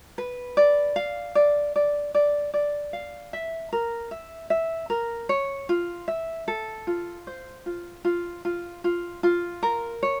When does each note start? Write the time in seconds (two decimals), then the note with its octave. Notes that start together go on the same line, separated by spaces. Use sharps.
0.18 B4
0.57 D5
0.96 F5
1.35 D5
1.76 D5
2.15 D5
2.54 D5
2.93 F5
3.33 E5
3.73 A#4
4.11 E5
4.50 E5
4.90 A#4
5.29 C#5
5.69 F4
6.08 E5
6.48 A4
6.87 F4
7.27 C5
7.66 F4
8.05 F4
8.45 F4
8.84 F4
9.23 F4
9.63 A#4
10.03 C#5